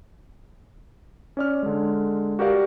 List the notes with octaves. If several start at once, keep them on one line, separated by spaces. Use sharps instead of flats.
C#4 D5 F6
D3 G#3
F#4 G4 A#4 D5 F5